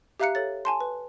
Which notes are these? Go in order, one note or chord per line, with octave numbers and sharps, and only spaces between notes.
G4 E5 F5 A#5 F#6 C#7
A4 C#5 A6
G#5 A5 C6
B4